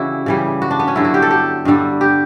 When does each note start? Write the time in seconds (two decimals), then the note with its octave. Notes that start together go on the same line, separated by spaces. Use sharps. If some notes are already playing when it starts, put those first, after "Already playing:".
Already playing: C#3 E3 G3 E4 F#4
0.26 C#3 E3 G3
0.62 F#4
0.71 D4
0.79 B3
0.87 C#4
0.95 G2 D3 F#3 E4
1.04 F#4
1.14 G4
1.22 A4
1.31 G4
1.65 G2 D3 G3
2.01 G4